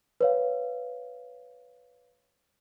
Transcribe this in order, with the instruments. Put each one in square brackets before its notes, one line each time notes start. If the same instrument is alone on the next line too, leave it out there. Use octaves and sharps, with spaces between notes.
[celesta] B4 C#5 F5